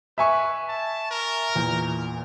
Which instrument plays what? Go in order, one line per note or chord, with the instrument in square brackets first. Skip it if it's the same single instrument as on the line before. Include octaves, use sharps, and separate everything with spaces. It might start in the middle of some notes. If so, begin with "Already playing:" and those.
[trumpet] B4 [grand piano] E5 G#5 C#6
[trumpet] A5
A#4
[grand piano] E2 A#2